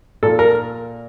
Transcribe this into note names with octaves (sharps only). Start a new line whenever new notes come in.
A#2 A4
A#4